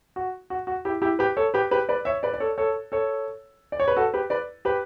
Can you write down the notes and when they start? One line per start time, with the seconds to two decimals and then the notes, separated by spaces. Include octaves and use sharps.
0.16 F#4
0.50 F#4
0.67 F#4
0.85 E4 G4
1.02 E4 G4
1.19 G4 B4
1.37 A4 C#5
1.54 G4 B4
1.71 G4 B4
1.89 B4 D5
2.05 C#5 E5
2.23 B4 D5
2.34 D5
2.40 A4 C#5
2.58 A4 C#5
2.92 A4 C#5
3.72 D5
3.80 C#5
3.88 B4
3.97 F#4 A4
4.14 G4 B4
4.30 B4 D5
4.65 G4 B4